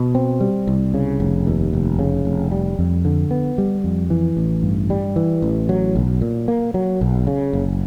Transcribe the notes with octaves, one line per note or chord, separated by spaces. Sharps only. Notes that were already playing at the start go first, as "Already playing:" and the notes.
Already playing: B2
C4
G3
C2
C#3
F1
D#2
F1
C#3
F1
G3
F2
D3
B3
G3
F2
E3
A1
G2
G3
E3
A1
F#3
B1
A#2
A#3
F#3
B1
C#3
F#1